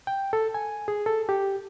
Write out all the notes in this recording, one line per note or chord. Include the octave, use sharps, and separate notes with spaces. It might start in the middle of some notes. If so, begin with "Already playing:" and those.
G5
A4
G#5
G#4
A4
G4